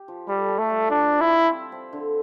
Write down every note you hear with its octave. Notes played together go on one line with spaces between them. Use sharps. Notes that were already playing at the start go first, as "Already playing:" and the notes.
Already playing: G4
F3
G3 A4
A4
A3
G3
F3 D4
F3
E4
F3
C4
C4
D3